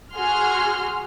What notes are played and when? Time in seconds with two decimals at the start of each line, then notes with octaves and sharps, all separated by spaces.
0.15 F#4 G#4 C6 F6